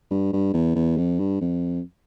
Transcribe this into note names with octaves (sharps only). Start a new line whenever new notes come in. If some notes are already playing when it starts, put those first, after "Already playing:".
G2
G2
E2
E2
F2
G2
F2